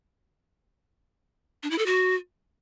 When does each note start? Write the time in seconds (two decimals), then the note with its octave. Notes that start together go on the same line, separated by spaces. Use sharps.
1.63 D4
1.71 E4
1.78 A4
1.86 F#4